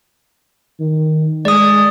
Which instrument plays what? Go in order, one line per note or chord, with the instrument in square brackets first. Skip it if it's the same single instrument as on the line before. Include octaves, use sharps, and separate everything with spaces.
[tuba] D#3
[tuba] G#3 [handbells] D5 D#6